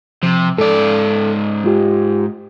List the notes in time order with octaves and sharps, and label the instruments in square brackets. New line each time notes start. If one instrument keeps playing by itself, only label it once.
[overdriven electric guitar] C3 [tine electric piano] F3
[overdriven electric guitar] G#2 D5 [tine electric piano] A4
[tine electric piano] G#3 F4 G4